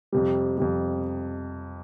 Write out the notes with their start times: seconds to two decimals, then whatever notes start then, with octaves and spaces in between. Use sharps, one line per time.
0.12 F2 C3 G3
0.58 F2 C3 G3